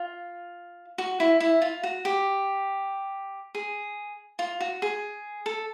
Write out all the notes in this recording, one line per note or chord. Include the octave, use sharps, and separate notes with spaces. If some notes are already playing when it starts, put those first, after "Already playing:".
Already playing: F4
F#4
E4
E4
F4
F#4
G4
G#4
F4
F#4
G#4
A4